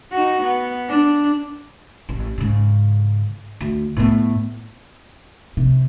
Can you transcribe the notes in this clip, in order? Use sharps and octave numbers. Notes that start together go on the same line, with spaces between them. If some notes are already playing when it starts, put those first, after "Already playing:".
D#4 F#4
B3
D4
A1
G#2 C#3
D2
A2 B3
C3